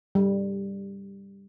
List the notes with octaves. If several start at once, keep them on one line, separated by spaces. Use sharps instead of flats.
G3